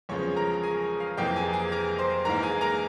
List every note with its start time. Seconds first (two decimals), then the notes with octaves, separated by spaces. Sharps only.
0.09 E2 C#3 F3 G#3 C#5 C#6
0.36 A#4 A#5
0.63 G#4 G#5
1.00 F5
1.17 F2 C3 E3 A#3 G4 G5
1.36 G#4 G#5
1.53 G#4 G#5
1.72 A#4 A#5
1.98 C5 C6
2.25 G#2 E3 A#3 A#4 A#5
2.43 G#4 G#5
2.61 A#4 A#5